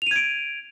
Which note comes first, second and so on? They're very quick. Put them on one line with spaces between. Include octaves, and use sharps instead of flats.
F7 D#7 G#6 D7